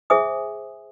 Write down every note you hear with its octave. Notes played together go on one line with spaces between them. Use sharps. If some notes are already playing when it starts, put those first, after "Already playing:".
G#4 C5 E5 G#5 D#6